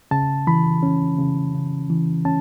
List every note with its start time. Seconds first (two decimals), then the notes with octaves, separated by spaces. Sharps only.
0.11 C#3 A5
0.47 E3 B5
0.83 C#4
1.18 C#3
1.54 C#3
1.90 E3
2.25 C#4 A5